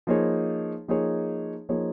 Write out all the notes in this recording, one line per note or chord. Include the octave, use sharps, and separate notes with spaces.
F3 A#3 D#4 G#4 C#5
F3 A#3 D#4 G#4 C#5
F3 A#3 D#4 G#4 C#5